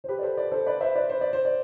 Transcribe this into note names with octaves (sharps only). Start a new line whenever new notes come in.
C5
G4 B4
D5
A4 C5
B4 D5
A4 C5
B4 D5
C5 E5
B4 D5
C5
D5
C5
D5